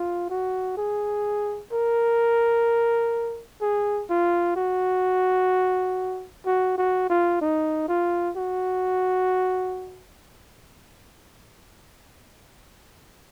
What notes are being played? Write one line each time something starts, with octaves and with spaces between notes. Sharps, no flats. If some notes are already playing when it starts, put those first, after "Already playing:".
Already playing: F4
F#4
G#4
A#4
G#4
F4
F#4
F#4
F#4
F4
D#4
F4
F#4